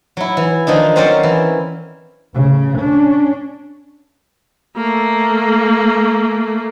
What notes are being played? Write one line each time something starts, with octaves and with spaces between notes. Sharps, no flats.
F#3 E4
E3
D#3 F3 D4 D#4
F#3 C4 C#4 A#4 C5 D5
E3
A1 C#3
C#4 D4
A3 A#3